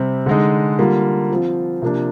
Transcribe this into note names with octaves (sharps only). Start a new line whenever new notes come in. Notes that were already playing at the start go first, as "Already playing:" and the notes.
Already playing: C3 G3 C4
D3 G#3 D#4
D3 G3 A#3 F4
F3 C4 F4
C3 F3 A#3 D4